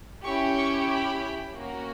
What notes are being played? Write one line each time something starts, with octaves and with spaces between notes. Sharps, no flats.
C#4 E4 G4 C#6
C#6
B5
A#3 C#4 F#4